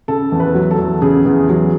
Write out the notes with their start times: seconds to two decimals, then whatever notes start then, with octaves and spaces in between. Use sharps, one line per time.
0.08 C#3 A4
0.32 E2
0.40 B4
0.55 F#3
0.71 A4
0.78 E2
1.02 C#3 G#4
1.25 E2
1.49 F#3